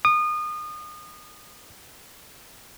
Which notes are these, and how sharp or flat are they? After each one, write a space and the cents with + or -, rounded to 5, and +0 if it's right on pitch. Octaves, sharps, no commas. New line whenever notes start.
D#6 -30